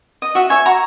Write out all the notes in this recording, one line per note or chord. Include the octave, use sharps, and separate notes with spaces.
D#5
F#4 E5
C#5 E5 G#5
F#4 A#5 C#6